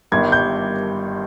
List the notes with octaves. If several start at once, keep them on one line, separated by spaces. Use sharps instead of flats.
G1 G2 D#3 G#6
G6